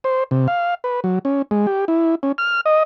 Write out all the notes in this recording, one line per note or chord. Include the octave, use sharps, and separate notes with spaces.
C5
C3
F5
B4
F#3
C#4
G#3
G4
E4
C#4
F6
D#5